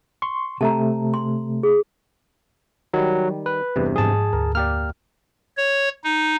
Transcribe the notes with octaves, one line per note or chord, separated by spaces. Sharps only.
C6 C#6
C3 A3 A5 A#5
C6
G#4
D#3 F#3 G3
B4
E2 G2 C3
F2 G#2 G#4 A5
D2 A#4
A#3 G4 D5 F6
C#5
D#4